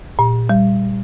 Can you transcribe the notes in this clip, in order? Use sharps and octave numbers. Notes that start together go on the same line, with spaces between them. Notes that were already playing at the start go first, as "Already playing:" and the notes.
A#2
G3